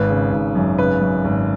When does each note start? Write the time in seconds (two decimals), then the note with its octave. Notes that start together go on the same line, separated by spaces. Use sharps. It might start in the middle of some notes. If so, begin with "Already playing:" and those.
Already playing: G#1 B4
0.09 C#3
0.32 G#1
0.55 F#2
0.78 C#3 B4
1.01 F#2
1.24 G#1